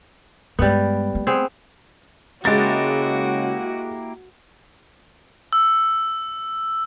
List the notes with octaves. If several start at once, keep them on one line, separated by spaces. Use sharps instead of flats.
G2 G3 G#3 B3
A3
B3 C4 G#4
C#3 G#3 A#3 E4 F#4 G4 A6
E6